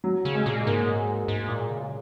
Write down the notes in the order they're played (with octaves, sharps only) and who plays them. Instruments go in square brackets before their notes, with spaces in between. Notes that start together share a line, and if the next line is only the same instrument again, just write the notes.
[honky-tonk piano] F#3
[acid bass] C#3
[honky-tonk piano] G#3
[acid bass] A#2
[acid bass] G#2 [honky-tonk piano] A#3
[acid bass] G#2
A#2
C#3